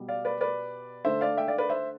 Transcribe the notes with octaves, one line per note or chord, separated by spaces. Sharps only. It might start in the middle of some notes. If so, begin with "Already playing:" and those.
Already playing: B2 G3
D5 F5
B4 D5
B4 D5
D3 A3 C5 E5
D5 F5
E5 G5
D5 F5
B4 D5
C5 E5